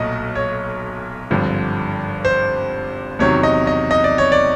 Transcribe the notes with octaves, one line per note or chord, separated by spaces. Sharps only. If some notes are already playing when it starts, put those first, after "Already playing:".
Already playing: B1 A#2 F#3 A3 D#5
C#5
G#1 G2 D3 F3
C5
E2 C3 D#3 F#3 C#5
D#5
D#5
D#5
D5
C#5
D5